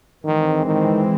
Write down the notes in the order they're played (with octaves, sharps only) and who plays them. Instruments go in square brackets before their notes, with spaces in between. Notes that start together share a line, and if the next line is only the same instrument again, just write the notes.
[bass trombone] D#3 [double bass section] E3 G#3 C4
[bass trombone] D#3